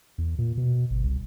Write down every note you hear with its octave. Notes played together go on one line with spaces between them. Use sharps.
E2
A#2
B2
G1
C2